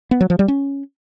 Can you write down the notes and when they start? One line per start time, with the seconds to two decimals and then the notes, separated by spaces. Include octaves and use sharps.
0.11 B3
0.21 F#3
0.30 F3
0.39 G3
0.48 C#4